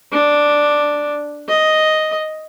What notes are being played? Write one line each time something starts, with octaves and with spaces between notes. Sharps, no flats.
D4
D#5